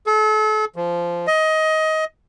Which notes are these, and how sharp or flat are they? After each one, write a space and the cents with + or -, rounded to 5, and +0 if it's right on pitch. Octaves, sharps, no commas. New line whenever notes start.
A4 -35
F3 -15
D#5 +20